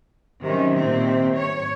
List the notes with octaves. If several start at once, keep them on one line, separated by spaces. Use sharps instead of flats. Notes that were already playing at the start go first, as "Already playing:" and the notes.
C3 D#3 F#3 C#4
A#2 D#3 C4
C#5